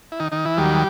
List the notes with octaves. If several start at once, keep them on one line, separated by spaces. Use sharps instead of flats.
E4
D#3 D#4
D#3 D#4
E3 E4
D#2 D#3 F#3 G3 G4